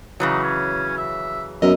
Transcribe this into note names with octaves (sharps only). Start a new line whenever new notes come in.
C#3 E3 F#3 D#4
C#4
E5
F#2 B3 A#4 D#5 E5